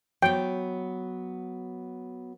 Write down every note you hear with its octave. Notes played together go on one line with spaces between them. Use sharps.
F#3 B3 G5